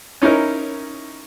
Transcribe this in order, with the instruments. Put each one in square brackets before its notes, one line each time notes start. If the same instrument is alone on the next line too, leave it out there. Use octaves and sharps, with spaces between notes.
[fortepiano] C#4 D#4 E4 A#4